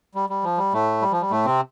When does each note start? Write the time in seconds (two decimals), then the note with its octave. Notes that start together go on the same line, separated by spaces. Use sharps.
0.15 G3
0.30 G3
0.44 F3
0.58 G3
0.73 A2 A3
1.02 G3
1.12 F3
1.22 G3
1.31 A2 A3
1.46 C3 C4